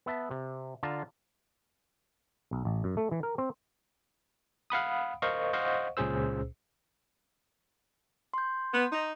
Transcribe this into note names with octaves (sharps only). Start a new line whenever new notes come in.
B3 E5 A5
C3
D3 F4 A5 A#5
B1
A1
F#2
A3
E3
A#4
C4
F5 F#5 B5 D#6
A#4 C5 D#5 F5 C#6
C5 D#5 F5 F#5 C#6
C#2 A#2 C#4 G#4 C5 E6
C6 G6
B3
D#4